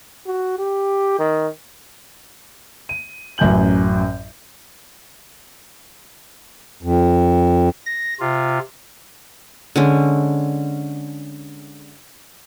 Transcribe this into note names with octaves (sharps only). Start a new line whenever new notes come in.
F#4
G4
D#3
D#7
A1 F#2 G#5 G6 F#7
F2
A#6
C3 F4
D3 G#3 C#4